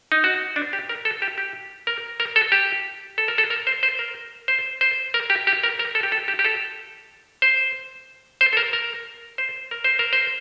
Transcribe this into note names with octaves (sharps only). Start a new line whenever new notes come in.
D#4
F#4
D4
G4
A#4
A4
G4
G4
A#4
A#4
A4
G4
A4
A#4
A4
A#4
C5
C5
A#4
C5
C5
A#4
G4
G4
A#4
A#4
A4
G4
A4
G4
G4
A4
C5
C5
A4
A#4
A#4
C5
A#4
C5
A#4
C5